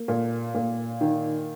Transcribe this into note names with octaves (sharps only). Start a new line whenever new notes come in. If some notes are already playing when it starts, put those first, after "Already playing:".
Already playing: A#3
A#2
A#2
D#3